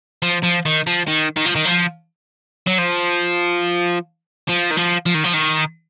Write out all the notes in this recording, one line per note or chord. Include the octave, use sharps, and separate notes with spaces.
F3
F3
D#3
F3
D#3
D#3
F3
D#3
F3
F#3
F3
F3
D#3
F3
F3
D#3
F3
D#3